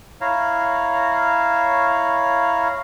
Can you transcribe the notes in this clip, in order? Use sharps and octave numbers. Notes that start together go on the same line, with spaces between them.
E4 C#5 F5 A#5